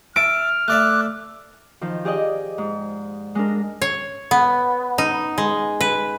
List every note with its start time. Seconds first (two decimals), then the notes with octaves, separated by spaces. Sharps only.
0.16 E5 A5 F6 D7
0.68 A3 D5 E5 D6 F#6
1.81 D#3 F3
2.05 G4 G#4 D5 D#5
2.58 G#2
3.35 G#3 D4 A#4
3.82 C#5
4.31 B3
4.98 D#4
5.38 G#3
5.81 B4